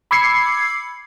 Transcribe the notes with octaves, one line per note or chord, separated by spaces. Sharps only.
B5 D6 E6 G#6 C7 C#7